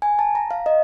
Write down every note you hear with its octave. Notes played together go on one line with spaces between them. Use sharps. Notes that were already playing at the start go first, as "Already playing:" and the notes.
G#5
A5
A#5
F5
D#5